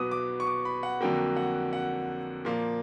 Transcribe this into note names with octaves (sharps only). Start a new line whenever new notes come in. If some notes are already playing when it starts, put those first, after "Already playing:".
Already playing: B2 F#3 B3 D6 D#6
D6
C#6
D6
B5
F#5
F2 D3 F#3 A#3 G5
F#5
F#5
A#2 F3 A#3